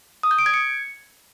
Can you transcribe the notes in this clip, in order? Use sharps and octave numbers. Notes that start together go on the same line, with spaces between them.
D#6
G6
D7
G#6
C#7